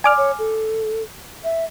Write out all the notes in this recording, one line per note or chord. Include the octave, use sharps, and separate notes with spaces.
D5 G#5 D6 F6
C#5
A4
E5